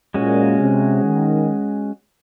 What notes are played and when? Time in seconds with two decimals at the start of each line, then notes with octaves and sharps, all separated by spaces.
0.14 A#2 G#3 C#4 F#4
0.59 C3
1.04 D#3